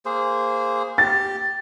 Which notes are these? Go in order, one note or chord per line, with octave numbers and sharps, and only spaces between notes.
A#3 G#4 C5
G4 A6